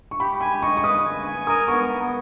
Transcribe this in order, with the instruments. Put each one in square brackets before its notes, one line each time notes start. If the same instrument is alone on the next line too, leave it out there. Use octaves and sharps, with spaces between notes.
[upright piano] C#6
[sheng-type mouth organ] G4 [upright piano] B5
[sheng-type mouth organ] G#5 [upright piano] B5
[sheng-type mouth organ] D#5 [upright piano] C#6
[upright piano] C#6
[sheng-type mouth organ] B4 [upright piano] D#6
[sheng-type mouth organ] G#5
G#5
[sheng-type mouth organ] A#4 [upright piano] D#6
[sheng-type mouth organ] B3 [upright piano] C#6
[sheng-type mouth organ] B3